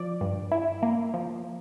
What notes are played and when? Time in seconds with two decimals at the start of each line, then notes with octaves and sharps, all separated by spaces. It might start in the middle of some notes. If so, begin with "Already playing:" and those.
Already playing: F3 D5
0.21 G2
0.52 E4
0.83 A#3
1.14 F3